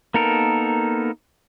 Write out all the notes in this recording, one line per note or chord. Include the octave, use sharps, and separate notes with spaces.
A#3 B3 D#4 A4 A#4